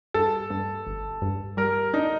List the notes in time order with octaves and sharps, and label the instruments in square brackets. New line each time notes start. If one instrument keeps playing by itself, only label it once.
[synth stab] G2 [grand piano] A4
[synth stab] G2
G1
G2
[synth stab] G3 [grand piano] A#4
[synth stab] D4 [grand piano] D#4